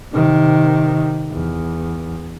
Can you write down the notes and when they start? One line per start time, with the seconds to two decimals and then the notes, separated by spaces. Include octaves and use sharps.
0.13 C3 D#3
1.32 E2